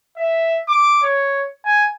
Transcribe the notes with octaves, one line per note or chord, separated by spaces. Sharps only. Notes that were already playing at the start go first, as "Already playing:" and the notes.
E5
D6
C#5
G#5